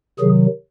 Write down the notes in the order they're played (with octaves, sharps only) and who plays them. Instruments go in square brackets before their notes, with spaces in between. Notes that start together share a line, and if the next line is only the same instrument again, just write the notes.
[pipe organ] C3 D#3 F#3 G#4